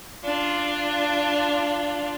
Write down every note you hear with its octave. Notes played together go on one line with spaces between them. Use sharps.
D4 F4